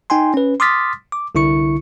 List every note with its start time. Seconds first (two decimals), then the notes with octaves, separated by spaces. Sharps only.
0.10 D#4 G5 G#5 C6
0.34 C#4 B4
0.60 C6 D6 D#6 F6 A6 B6
1.12 D6
1.35 C2 D3 E4 C#6 C#7